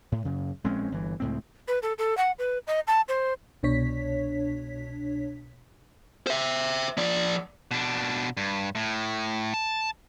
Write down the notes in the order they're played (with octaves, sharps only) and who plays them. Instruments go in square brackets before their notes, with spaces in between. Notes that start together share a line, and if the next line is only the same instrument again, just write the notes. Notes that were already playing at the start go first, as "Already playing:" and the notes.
[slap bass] A2
F#2 C#3
A#1 G#3 C4 C#4
G1 E3
C#2 A2 C4
[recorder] B4
A4
A4
F#5
B4
D#5
A5
C5
[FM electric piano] C2 B2 D4 C#5 B6
[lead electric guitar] C5 E5
F3 D5
[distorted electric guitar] B2 D4
G2
A2
A5